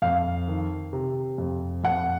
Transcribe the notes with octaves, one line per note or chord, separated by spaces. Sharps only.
F2 F5
D#3
C3
F2
F2 F#5